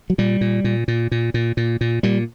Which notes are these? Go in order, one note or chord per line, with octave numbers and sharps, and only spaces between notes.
F#3
A#2 G3
A#2
A#2
A#2
A#2
A#2
A#2
A#2
A#2 G3